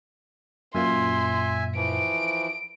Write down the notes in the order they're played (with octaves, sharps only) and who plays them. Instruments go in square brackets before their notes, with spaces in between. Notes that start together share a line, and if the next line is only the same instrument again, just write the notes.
[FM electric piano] F#2 A#2 F4 [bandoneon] E5 G#5 [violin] C6
[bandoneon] E3 F3 [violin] D7